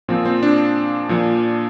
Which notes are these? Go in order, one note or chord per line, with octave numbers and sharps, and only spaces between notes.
A#2 F3 C4
C4
D4
A#2 F3